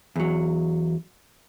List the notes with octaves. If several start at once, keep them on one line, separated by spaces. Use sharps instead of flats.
E2 F#3